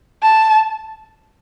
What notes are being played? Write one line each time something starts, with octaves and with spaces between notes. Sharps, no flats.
A5